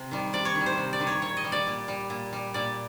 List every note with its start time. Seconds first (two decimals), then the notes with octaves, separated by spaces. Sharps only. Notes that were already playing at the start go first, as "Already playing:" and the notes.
Already playing: C3
0.11 D#3 G3
0.33 C3 D5
0.45 C#5
0.55 D#3
0.61 G3
0.66 C5
0.78 C3
0.93 D5
1.00 D#3 G3
1.07 C#5
1.22 A#2 C#5
1.37 D#5
1.44 G3
1.52 D5
1.67 A#2
1.88 G3
2.10 A#2
2.33 G3
2.54 A#2 D5